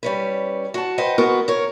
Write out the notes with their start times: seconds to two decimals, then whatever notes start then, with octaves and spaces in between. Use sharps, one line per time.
0.03 G3 C#4 B4
0.74 F#4 A5
0.98 B4 C5 D#5 F#5 G5
1.18 G#3 B3 F#4 A#4
1.48 A#4 C#5